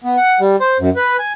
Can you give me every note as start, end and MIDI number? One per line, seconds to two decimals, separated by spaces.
0.04 0.16 59
0.17 0.39 78
0.40 0.56 55
0.61 0.78 72
0.80 0.90 42
0.96 1.17 71
1.19 1.33 80